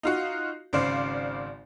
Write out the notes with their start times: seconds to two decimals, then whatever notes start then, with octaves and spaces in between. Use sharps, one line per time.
0.03 D#4 F4 F#4
0.73 G#1 C#3 C5 D5 F5